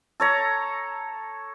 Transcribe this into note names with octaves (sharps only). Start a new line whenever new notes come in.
A4 C#5 A#5